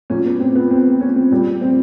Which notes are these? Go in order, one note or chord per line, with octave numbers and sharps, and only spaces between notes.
A#2 F#3 C#4
B3
C4
B3
C4
C#4
C4
A#2 G3
C4